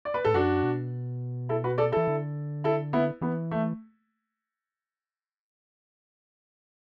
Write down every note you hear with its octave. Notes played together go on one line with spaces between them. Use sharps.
D5
B4
A2 A4
F#2 D4 F#4
B2
E4 A4
F#4 B4
A4 D5
E3 E4 A4
D3
E4 A4
B3 E4
E3 B3
A3